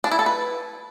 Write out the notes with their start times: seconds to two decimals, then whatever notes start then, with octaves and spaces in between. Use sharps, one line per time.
0.04 D4
0.12 E4
0.19 A4
0.26 B4